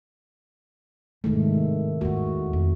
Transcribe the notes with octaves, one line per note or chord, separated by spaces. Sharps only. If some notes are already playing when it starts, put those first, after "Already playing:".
G#2 C3 D#3 G#3 A3
E2 F4 F#4
F2